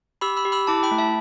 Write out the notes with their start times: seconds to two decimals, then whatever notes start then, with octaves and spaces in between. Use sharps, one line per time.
0.21 G4 B5 E6
0.37 B5 E6
0.45 G4
0.52 B5 E6
0.67 E4 A5 D6
0.83 G5 B5
0.91 A3
0.98 E5 A5